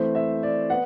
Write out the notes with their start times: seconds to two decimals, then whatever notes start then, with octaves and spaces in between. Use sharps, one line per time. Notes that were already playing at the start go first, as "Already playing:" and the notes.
Already playing: E3 A3 C4 C5
0.15 E5
0.43 D5
0.70 B3 F#5